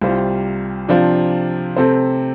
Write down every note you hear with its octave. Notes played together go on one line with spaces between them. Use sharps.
C2 C3 G3 F4 C5
C3 F3 D4 F4 C5
C3 A3 C4 A4 C5